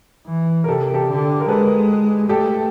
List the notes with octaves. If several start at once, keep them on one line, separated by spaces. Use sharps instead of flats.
E3
A#4
C3 G4 A4
G4 A4
D3
A#4
G#3 A4 B4
A3 G4 A4